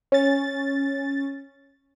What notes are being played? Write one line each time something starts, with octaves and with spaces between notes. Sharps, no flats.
C#4 A6